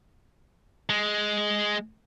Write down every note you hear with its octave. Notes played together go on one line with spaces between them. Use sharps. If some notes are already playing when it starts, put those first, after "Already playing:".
G#3